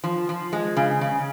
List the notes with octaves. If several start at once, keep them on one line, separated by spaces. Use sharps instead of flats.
F3
F3
G#3
C#3
C#3